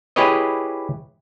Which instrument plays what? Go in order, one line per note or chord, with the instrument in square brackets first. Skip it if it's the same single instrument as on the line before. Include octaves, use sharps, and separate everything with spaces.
[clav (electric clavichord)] E4 G4 G#4 B4 C#5 D#5